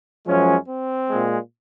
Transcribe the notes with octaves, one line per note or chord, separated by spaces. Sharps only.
F#2 F3 G#3 C#4
C4
A#2 G#3